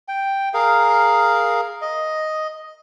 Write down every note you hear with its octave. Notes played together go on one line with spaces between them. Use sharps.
G5
G#4 A#4 F5
D#5